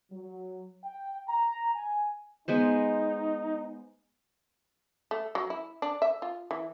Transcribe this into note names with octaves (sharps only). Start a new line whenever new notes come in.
F#3
G5
A#5
G#5
G#3 B3 D#4 C5
A3
F#3
E4
D4
E5
F4
E3